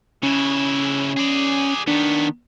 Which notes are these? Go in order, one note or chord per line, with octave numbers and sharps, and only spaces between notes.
C#3 C#4 E4
G#4 D5
D#3 B3 D4